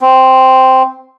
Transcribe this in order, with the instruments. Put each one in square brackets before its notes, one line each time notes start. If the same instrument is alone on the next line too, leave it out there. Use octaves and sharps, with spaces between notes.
[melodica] C4